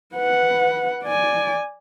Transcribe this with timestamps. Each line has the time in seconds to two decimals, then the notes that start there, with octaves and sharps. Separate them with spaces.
0.15 B4 F#5
1.03 D5 G#5